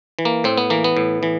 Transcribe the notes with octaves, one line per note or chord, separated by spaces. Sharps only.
E3
A#3
A2 C4
B3
E3 A#3
B3
A2
E3